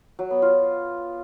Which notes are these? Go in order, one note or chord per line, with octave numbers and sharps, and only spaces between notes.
F#3
B3
F4